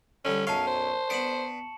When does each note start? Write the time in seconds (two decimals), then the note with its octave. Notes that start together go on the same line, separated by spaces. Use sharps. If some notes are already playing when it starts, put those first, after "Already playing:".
0.25 D3 G3 C#4
0.47 B1 F#2 C#5 F5 A5 C#6
0.67 C5
1.10 B3 D4 C#7 E7 F#7